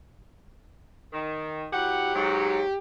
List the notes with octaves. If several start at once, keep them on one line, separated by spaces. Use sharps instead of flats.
D#3
F#3 E4 G4 F#5
G#2 F#3